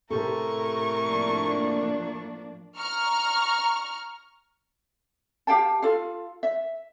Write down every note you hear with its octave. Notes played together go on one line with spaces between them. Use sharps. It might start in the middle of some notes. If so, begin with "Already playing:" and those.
A2 C3 G4 A4 A#4 C#6
F3 A#3 D4
A#5 C#6 F6
G4 F5 G5 A5
F4 A4 F5
E5